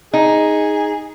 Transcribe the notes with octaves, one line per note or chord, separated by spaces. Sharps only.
D#4 G#4